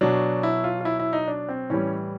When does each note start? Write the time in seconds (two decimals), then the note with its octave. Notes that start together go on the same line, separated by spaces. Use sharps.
0.01 B2 F#3 D4
0.43 E4
0.64 F4
0.81 F4
0.85 E4
0.99 E4
1.13 D#4
1.28 D4
1.49 C4
1.70 A2 E3 G3 C#4